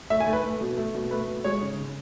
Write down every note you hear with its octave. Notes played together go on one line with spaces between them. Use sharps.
A3 E5
G#5
A3
B4
A3
B2
A3
B2
A3 B4
B2
G#3 C#5
C#3
C#3